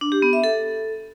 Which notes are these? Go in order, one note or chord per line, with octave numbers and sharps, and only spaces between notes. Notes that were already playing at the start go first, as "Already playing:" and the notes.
D4
G4
B3
E5
A4